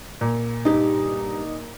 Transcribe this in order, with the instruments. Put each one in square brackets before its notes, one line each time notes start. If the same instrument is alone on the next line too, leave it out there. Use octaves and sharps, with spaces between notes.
[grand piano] A#2
[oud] G2 G4 [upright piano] D#4